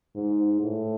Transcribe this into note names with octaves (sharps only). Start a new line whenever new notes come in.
G#2
A2